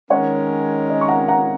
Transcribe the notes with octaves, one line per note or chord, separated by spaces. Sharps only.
D#3 G#3 C#4 A#4 C#5 F#5
D#5
C#6
F#5 A#5
F#5 A#5